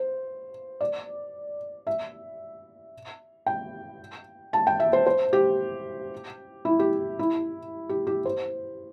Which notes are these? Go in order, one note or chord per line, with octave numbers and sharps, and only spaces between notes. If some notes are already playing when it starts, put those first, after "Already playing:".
Already playing: C5
D5
E5
G5
A5
G5
E5
C5
C5
G4
E4
G4
E4
G4
G4
C5